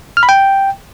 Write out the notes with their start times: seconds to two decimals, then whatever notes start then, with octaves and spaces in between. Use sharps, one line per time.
0.17 F6
0.23 B5
0.29 G5